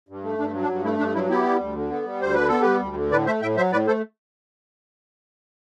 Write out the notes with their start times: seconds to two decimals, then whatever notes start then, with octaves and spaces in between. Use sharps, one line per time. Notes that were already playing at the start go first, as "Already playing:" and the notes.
0.09 G2
0.24 A3
0.38 G2 D4
0.53 F#3
0.62 D4
0.69 G2
0.84 A3 E4
0.99 G2 D4
1.15 F#3 E4
1.29 B3 E4 G4
1.45 G3
1.60 D2
1.75 D3
1.90 B3
2.05 G3
2.20 D2 C5
2.34 D3 B4
2.48 B3 A4
2.61 G3 G4 B4
2.81 D2
2.96 D3
3.11 A2 B4 D5
3.26 A3 C5 E5
3.41 A2 E5 G5
3.57 F#3 C5 E5
3.72 A2 B4 D5
3.87 A3 A4 C5